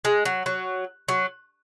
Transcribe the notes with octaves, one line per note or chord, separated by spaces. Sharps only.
G#3
F#3
F#3
F#3